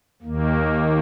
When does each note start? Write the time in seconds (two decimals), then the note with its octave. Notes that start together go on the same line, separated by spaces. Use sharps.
0.22 D#2 D#3 A#3